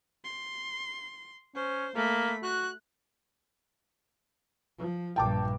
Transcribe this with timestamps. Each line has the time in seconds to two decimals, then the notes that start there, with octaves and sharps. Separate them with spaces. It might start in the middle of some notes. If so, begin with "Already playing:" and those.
0.24 C6
1.55 C#4 C5
1.95 A3 A#3 B5
2.43 F#4 F#6
4.79 F3
5.16 A#1 G2 G5 A5 D6